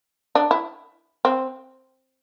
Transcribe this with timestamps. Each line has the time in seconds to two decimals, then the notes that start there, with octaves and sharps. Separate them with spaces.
0.35 D4
0.51 E4
1.25 C4